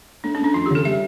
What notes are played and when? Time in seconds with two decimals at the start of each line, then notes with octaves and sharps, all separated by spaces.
0.24 A3 D4
0.35 C#4
0.40 A3 D4
0.54 F2 F4
0.66 G4
0.71 C#3 A4
0.85 G3 E5